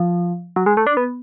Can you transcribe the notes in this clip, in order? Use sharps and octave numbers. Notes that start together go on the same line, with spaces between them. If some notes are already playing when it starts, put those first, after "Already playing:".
Already playing: F3
F#3
G#3
A3
D4
B3